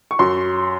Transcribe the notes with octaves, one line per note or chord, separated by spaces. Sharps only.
C#6
F#2 C6